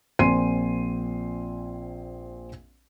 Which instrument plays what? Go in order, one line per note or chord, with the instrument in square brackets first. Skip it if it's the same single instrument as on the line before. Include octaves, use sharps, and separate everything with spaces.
[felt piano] A#1 C4 G#5 C6 C7 D#7